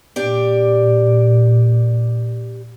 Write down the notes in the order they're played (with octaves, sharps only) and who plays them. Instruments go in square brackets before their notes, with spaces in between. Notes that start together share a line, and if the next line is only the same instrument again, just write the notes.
[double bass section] A#2 [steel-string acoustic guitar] D4 G4 D5